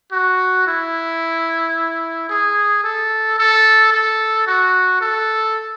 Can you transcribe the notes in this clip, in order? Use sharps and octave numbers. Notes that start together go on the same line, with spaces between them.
F#4
E4
G#4
A4
A4
A4
F#4
A4